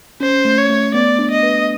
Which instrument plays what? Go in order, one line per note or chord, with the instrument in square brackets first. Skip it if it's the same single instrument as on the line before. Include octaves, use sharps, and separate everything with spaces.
[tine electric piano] C#4 [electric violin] C5
[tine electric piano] A3
[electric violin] C#5
[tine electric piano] A3
[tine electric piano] B3 [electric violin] D5
[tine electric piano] D4
[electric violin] D#5
[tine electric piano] B4